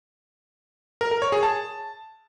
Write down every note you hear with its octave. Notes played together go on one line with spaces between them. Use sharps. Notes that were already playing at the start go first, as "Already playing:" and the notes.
A#4
A#4
C#5
G#4
A5